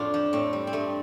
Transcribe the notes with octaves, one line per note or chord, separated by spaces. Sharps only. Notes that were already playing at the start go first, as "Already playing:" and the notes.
Already playing: F2 A2 D4 F4 A4
F3
A2 C4
G3
C4
G2 A3